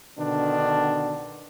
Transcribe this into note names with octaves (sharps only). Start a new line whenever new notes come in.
B2 D3 D#3 D4